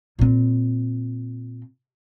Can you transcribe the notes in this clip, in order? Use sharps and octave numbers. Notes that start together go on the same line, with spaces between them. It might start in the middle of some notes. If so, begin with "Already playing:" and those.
A#2 C4